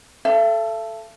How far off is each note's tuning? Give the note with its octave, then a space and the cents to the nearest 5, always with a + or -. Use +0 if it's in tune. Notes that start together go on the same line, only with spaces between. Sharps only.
A4 +0 E5 +40